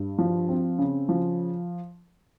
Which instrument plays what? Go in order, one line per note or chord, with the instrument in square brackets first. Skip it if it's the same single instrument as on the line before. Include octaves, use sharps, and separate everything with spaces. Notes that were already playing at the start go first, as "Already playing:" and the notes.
Already playing: [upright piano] G2
F3
C4
C#3
F3